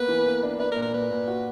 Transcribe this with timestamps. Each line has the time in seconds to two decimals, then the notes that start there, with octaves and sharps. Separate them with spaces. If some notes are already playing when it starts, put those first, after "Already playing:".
Already playing: A#3 B3 B4
0.08 E3
0.26 A#3
0.43 D4
0.59 D4 B4
0.72 A#4
0.76 A#2
0.82 A#4
0.94 A#2 B4
1.11 A#2
1.28 F#4